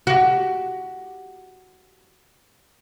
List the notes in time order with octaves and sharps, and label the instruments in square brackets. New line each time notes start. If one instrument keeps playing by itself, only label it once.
[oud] F#4 G4